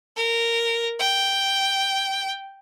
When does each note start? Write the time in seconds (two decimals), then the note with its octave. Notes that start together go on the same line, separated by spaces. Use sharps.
0.16 A#4
1.00 G5